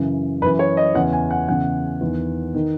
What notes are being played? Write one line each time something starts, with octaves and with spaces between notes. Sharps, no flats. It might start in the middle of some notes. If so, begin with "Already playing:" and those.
Already playing: F#2 C#3 E3
F#2 E3 B4
C#5
D#5
E2 C#3 E3 F#5
G#5
F#5
E2 C#3 E3 F#5
E2 D#3
D#3